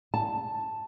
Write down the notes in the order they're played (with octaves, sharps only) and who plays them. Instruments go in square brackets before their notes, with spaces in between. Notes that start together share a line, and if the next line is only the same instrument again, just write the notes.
[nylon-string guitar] A5